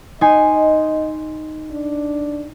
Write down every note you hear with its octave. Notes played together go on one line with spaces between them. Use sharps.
D#4 D#5 G#5 C6
D4